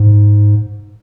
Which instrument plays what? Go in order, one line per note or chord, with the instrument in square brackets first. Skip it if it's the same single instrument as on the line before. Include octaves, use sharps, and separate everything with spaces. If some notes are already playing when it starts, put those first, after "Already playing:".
Already playing: [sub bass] G#2